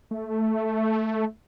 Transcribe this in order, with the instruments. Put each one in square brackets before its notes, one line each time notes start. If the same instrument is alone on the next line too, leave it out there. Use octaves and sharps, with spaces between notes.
[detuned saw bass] A3